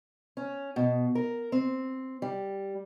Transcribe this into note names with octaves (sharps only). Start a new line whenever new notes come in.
C#4
B2
A#4
C4
G3